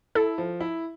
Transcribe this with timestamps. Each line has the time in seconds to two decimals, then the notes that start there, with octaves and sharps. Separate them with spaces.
0.15 E4 A4
0.38 F3
0.61 E4